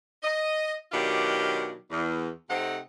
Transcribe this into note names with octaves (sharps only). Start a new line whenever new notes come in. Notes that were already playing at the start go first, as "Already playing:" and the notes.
D#5
B2 D#3 F#3 D4 F4 G4
E2
C3 A3 C4 D#4 F#5